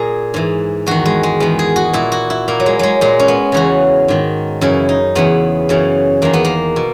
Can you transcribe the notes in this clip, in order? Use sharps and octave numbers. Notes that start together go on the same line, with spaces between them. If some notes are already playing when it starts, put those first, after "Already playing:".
Already playing: A#2 G#4 A#4
G#2 E3
E2 D#3 F#4
G#3
G#3
E2 D#3 B3
G#4
F#4
A#2 E4
F#4
E4
A#2 A#3
F#3
G#3
F#3 G#3
A#2 G#3
C#4
B3
E2 C#3 E3 F#4
G#2 D#3
F#2 C#3 E3 E4
D#4
E2 C#3 E3 B3
F#2 C#3 E3
E2 D#3 A#3
B3
A#3
B2